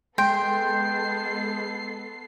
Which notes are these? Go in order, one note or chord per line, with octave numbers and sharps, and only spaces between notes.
G#3 B3 A4 G5 C6 C7